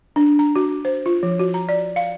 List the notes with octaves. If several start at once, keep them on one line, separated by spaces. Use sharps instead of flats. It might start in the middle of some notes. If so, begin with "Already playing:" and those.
D4
A#5
F#4
C5
F4
F3
F#4
A#5
D5
F5